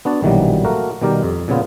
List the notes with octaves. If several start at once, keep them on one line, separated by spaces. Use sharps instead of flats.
B3 D4 F#4 A5
A#1 B2 D#3 E3 F#3 G3
A3 A#3 F#4 A#4
B2 D#3 G3 G4 A#4
F2
A#2 C#3 B3 F4